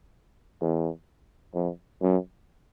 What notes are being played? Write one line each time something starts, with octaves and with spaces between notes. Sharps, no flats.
E2
F2
F#2